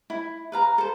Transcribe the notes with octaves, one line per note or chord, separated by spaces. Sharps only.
E4
B4 F5 A#5
A4 C5